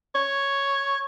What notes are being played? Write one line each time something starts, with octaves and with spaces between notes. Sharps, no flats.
C#5